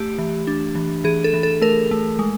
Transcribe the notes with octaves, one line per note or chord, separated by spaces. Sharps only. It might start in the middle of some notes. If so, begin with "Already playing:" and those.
Already playing: A3 G4
E3
D4
E3
E3 G#4
A4
E3
A4
A3 A#4
A3
G#3